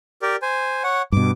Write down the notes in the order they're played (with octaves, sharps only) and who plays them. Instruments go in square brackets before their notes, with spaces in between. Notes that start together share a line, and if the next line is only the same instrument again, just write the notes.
[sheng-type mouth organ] G4 A#4 D5
C5 G#5
C#5 F#5
[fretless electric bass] G2 B2 [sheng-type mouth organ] D6